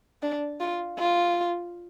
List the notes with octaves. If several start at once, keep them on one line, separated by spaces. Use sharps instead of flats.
D4
F4
F4